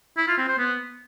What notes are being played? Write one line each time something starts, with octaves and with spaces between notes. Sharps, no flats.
E4
F4
C4
C5
B3